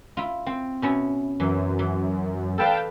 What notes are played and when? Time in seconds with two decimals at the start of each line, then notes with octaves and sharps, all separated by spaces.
0.17 E4 F4
0.46 C4
0.82 B2 C#4 E4
1.40 F#2 E3
1.79 E3
2.58 A4 B4 D5 F5 G5 A5